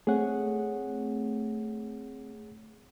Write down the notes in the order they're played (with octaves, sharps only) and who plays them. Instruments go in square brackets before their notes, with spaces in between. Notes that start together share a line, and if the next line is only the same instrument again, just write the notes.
[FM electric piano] A3 C4 [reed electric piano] G#4 C#5 F#5